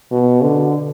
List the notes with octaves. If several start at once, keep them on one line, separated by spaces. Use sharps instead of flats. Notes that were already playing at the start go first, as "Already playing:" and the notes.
B2
D3